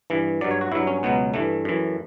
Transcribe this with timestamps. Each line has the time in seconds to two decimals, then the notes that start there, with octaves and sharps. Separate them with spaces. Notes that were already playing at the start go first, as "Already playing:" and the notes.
0.10 G2 E3
0.41 G2 F#3 D5
0.51 C#5
0.61 F#4
0.72 G2 F#3 E4
0.87 C#4
1.03 C#2 B2 F#3 B3
1.34 G2 E3 A3
1.65 F#2 E3